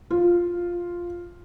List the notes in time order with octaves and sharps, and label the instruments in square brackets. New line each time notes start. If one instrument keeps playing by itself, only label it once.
[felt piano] F4